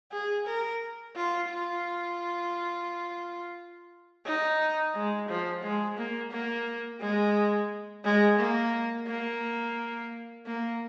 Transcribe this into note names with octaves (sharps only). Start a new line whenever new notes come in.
G#4
A#4
F4
F4
D#4
G#3
F3
G#3
A#3
A#3
G#3
G#3
A#3
A#3
A#3